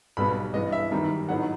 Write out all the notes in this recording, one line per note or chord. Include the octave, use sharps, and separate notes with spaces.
B1 B2 G3 B3 B5
G2 E3 B3 D#5
E5
F#2 D#3 G3 B3
A2 F#3 B3 D#4 F#5